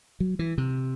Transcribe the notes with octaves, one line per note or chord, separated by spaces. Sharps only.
F#3
E3
C3